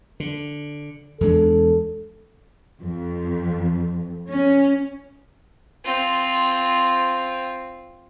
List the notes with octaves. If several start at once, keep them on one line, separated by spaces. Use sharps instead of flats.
D3
E2 G#3 D4 A4
F2
C#4
C4 F4